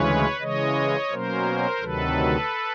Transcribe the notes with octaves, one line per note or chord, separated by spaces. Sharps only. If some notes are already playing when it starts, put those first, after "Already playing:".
Already playing: D2 C#3 E3 G#3 C#4 B4 C#5
C#3 E3 G#3 C#5 D#5
B2 F#3 A#3 C#4 A#4 C5
D2 C3 D#3 F#3 A4 B4